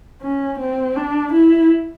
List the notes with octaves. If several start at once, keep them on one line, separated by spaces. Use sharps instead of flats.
C#4
C4
D4
E4